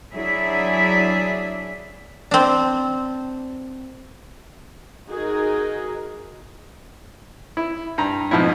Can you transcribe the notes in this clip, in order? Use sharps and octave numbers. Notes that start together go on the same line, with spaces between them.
F#3 D4 E4 G#4 E5
C4 D4
D#4 F#4 G#4 A#4
E4
G2 A#5
F2 G#2 B2 F3 B3 E4